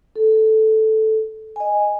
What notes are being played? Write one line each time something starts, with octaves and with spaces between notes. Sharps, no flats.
A4
D#5 G#5